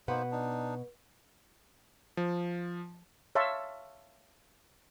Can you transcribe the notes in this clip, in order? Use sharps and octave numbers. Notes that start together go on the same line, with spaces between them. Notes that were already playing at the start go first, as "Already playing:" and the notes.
B2 A#3 D#4 B4 C5 F#5
D4 D#4
F3
C#5 E5 F5 A5 C6 C#6